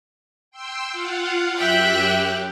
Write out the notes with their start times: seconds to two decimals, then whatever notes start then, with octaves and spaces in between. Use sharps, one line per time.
0.51 G5 C6 E6
0.90 F4 F5 F#5
1.59 F#2 G4 E5 G5 F#6